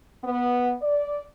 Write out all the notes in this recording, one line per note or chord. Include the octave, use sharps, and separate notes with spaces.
B3
D5